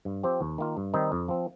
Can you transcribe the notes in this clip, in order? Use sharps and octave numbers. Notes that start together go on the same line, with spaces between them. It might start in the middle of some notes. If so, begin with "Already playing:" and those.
G2
F3 C4 G4 C5
D#2
D#3 A#3 F4
G2
D#3 G3 C4 D#4
F2
F3 C4